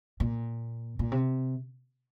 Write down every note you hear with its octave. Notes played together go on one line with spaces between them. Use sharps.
A#2
A#2
C3